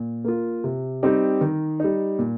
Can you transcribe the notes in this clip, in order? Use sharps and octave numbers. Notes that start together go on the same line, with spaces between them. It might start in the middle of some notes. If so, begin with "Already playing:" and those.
Already playing: A#2
A#3 F4
C3
G3 C4 D#4 G4
D#3
G3 D#4
A#2